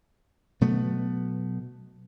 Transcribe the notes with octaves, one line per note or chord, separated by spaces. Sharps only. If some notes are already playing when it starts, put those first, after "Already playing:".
B2 F#3 A3 B3